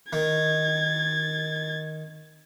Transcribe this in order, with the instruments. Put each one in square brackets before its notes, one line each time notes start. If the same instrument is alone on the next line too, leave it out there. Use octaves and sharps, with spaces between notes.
[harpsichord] D#3 [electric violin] G#6 A6